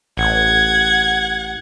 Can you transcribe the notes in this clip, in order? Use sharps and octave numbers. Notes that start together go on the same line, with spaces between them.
A1 F#5 G#6